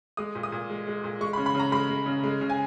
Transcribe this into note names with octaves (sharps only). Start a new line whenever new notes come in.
G#3 D#6
A#2
D#6
A#2
G#3
G#3
A#2
G#3 C#6
B5
C#3
B5
C#3 A#5
G#3 B5
G#3
C#3
G#3
C#3
G#5